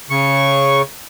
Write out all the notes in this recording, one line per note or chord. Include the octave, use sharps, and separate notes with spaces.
C#3 C#6